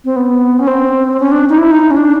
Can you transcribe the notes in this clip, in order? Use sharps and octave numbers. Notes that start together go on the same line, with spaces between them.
C4
B3
C#4
C4
C#4
D4
D#4
E4
D#4
C#4
D4